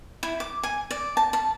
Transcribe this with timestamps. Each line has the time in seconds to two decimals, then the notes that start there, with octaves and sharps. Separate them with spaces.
0.23 E4
0.40 D6
0.63 G#5
0.91 D5
1.17 A5
1.33 A5